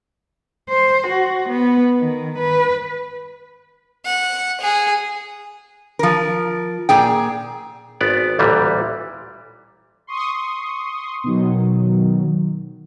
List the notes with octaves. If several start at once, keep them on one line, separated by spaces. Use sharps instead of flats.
C5
F#4
B3
D#3
B4
F#5
G#4
F3 A#4
A#2 G#4 G5
G#1 B3 D5
A1 D2 A#2 E3 G3
C6 C#6 D#6
B2 D#3 F#3